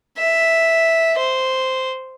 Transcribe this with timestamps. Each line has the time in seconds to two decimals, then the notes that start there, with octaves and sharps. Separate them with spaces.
0.18 E5
1.18 C5